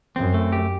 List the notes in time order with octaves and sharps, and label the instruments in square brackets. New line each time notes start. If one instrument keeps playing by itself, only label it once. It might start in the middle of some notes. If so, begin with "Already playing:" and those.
[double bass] F#2 [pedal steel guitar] C4
[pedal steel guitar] A3
G4